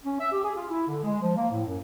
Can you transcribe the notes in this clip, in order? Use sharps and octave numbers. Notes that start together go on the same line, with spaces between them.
C#4
E5
G4
G#4
F4
E4
D3
G#3
F3
A#3
A2
F#2